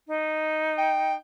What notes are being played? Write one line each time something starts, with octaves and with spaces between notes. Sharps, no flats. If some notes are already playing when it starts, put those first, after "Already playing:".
D#4
G5